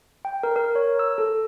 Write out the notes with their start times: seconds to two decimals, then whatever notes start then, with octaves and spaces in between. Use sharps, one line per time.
0.25 G5
0.43 A#4
0.56 A#4
0.75 C#5
0.99 E6
1.18 A4